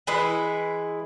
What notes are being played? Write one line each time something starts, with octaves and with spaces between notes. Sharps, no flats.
E3 G#3 E4 B4